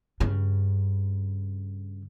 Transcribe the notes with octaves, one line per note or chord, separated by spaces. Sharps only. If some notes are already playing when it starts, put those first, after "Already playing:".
G2 C#3